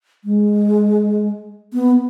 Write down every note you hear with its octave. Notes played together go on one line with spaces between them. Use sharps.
G#3
B3